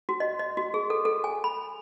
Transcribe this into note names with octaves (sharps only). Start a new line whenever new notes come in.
F#4
D#5
D#5
F#4
G#4
A4
A4
G#5
B5